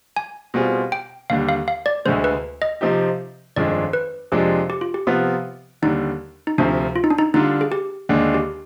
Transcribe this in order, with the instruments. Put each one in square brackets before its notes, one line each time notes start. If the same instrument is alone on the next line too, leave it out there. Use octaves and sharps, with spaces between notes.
[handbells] G#5
[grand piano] B2 G3 C4 F4 G#4
[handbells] G5
[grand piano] D#2 D3 G3 [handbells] F5
[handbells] F5
F5
D5
[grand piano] D2 D3 G#3 [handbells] C5
[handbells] B4
D#5
[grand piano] C3 F3 C4 D#4 G4
[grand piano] G1 F2 D#3 G#3 D4 [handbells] D5
[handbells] B4
[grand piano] F2 C3 F3 G#3 D4 [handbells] G4
[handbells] G4
F4
G4
[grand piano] C3 F3 B3 F4
[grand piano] D#2 D3 G3 [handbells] D#4
[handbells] D#4
[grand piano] D2 C3 F3 [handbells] D4
[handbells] F4
D#4
D4
D#4
[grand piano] D3 G3 D4 F4 [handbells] D#4
[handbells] G#4
G4
[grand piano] D#2 D3 G#3 D4 [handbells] G#4
[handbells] G4